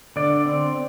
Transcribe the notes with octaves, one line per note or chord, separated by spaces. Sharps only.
D3 D5
C4